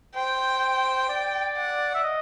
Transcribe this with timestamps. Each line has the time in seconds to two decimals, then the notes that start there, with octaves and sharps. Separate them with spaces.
0.15 C5 G5
1.09 D5
1.56 F#5
1.94 E5
2.03 D#5